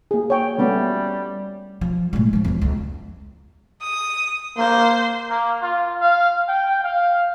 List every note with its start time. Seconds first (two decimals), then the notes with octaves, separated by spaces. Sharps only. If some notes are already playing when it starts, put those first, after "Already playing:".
0.11 A#3 G#4
0.30 C#5 G5
0.58 G3 A3 B3 C#4
1.81 F3
2.13 A2 G#3
2.33 F3 D4
2.45 E2 F3
2.62 C#2
3.81 D#6
4.58 A#3 C5
5.30 A#3
5.62 F4
6.01 F5
6.49 G5
6.84 F5